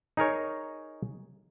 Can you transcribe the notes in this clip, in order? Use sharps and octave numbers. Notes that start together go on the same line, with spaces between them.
D#4 G#4 A#4 C#5